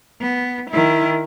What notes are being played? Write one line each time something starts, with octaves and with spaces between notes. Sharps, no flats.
B3
D#3 E4